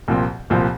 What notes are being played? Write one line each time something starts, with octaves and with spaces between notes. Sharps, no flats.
C2 A#2 F3 C4
C2 A#2 F3 C4